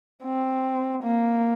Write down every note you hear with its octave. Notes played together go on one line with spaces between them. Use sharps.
C4
A#3